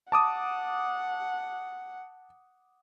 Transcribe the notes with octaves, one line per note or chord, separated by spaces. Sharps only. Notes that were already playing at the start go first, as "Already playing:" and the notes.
F#5 A5 D6 D#6